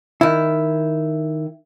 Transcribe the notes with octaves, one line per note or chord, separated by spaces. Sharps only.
D#3 E4